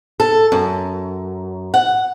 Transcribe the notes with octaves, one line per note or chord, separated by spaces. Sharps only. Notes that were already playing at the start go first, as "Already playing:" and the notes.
A4
F#2
F#5